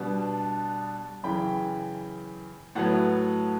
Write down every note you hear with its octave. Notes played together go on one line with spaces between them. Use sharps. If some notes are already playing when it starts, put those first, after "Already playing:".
Already playing: B2 G3 B3 D4 F#5 A5
F#2 C#3 E3 G5 B5
A2 F#3 B3 F#5 A5